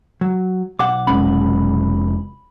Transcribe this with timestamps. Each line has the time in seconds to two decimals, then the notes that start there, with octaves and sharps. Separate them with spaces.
0.21 F#3
0.79 B1 F#5 D6
1.07 F1 G#3 C#4 B5